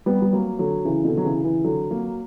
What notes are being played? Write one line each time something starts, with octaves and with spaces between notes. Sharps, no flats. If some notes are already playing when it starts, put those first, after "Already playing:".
G3 B3
G3
F#3 A#3
D3 F#3
C#3 E3
B2 D3
F#3
C#3 E3
C#3 E3
D3 F#3
F#3 A#3